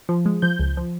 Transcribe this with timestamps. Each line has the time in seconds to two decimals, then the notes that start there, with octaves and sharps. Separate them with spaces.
0.09 F3
0.26 G#3
0.42 F3 G6
0.59 C#2
0.77 F3